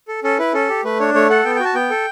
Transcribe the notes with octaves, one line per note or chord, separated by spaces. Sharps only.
A4
C#4 A4
E4 B4
C#4 A4
G4
A3 B4
D4 C#5
A3 C#5
A4 F#5
B3 G5
G5
F#4
A5
B3 G5
A4